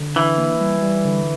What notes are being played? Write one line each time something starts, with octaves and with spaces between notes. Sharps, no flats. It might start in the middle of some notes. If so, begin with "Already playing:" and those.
Already playing: D3
E3 D4
A#3
G3
G3
D3